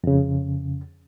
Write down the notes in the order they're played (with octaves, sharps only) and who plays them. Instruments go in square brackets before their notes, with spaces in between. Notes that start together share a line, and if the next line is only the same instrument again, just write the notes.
[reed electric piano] F2 C#3